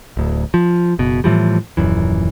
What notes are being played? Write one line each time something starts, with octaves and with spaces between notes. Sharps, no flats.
D1 D2
F3
F#1 B2
A2 E3 F3 G3
D#1 F#2 E3